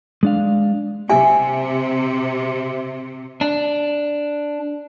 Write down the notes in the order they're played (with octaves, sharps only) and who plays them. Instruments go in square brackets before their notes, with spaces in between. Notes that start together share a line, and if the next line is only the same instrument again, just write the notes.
[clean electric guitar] G#3 D4 F5
[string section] C3 [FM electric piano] G4 E5 [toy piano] G#5
[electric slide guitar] D4